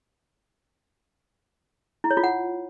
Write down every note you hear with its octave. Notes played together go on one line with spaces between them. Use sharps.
E4
C#5
F4
F#5